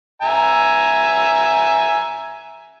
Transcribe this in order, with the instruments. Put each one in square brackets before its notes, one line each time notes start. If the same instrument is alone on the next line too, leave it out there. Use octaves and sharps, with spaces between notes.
[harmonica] E5 G#5 A#5